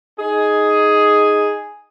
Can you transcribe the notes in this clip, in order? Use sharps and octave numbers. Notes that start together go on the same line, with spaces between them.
D#4 G#4